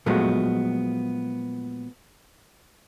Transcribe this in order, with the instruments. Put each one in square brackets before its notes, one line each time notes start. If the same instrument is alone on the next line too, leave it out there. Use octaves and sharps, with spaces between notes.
[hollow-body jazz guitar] A#2 F3 F#3 G#3 A3 B3